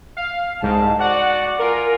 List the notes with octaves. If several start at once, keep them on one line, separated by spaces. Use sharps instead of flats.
F5
C2 G#2 A5
F#4 D5 F#5
F4 A#4 G#5